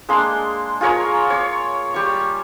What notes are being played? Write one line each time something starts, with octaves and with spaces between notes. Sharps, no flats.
G#3 A#3 D4 C6
F4 G#4 A#4 C#5
C#5 D6
G3 C#6